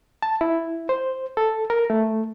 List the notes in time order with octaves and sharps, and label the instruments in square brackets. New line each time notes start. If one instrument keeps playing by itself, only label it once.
[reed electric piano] A5
E4
C5
A4
A#4
A3